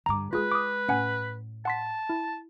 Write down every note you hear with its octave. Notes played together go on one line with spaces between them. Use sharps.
G2 D3 A#5 D6
G3 G#3 F4 G#4 B4
D6 D#6
A2 C#4 F#5 G#5
F#5 A5 C6 B6
E4